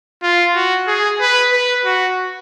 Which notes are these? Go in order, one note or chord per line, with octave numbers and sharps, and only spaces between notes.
F4
F#4
G#4
B4
B4
F#4